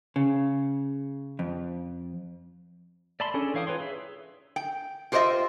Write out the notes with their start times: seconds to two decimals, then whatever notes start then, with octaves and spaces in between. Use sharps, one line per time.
0.16 C#3
1.39 F2
3.20 D5 E5 A5 B5 C6
3.34 C#4 D4 G#4 A4
3.54 E3 C#5 F5 G5 D#6
3.67 D#4 F4 B4 C#5 C6
3.80 G#4 E5
4.56 G5
5.12 F4 G4 C5 C#5 D#5 E5